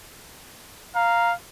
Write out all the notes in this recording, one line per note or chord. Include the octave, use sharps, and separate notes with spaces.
F5 A#5